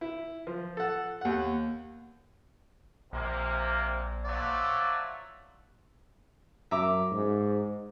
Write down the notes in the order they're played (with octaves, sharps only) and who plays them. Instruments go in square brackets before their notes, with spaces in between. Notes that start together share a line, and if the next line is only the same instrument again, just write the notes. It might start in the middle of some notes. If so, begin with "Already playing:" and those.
[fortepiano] E4
F3
A4 F#5
D#2 F#5
[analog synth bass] A#1 [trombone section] C3 A#3
[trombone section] F3 F#3 A3 [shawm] D5
[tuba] F#2 [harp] E5 A#5 D6
[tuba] G#2